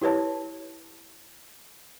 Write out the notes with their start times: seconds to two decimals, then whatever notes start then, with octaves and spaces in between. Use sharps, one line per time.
0.01 E4 G4 B4 C#5 A5